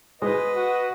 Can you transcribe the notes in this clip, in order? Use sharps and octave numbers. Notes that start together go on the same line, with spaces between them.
G#3 F#4 G#4 B4 C5 D#5 D#6
F#4